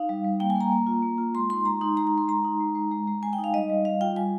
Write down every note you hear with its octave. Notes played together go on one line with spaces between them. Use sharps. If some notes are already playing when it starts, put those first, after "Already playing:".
Already playing: D#4 F5
G3
G3
A#3 G5
G#5
A#3
A#5
A#3
F4
A#3
F4
G#3 C6
D#4 C6
G#3 A#5
D#4 C6
G#3 A#5
A#5
G#3 C6
G#3 A#5
D#4
G#3
G#3
G#3
G#3
G#3 G#5
G5
D#4
F5
G3 D#5
G3
G3 F5
F4 G5
G3 G#5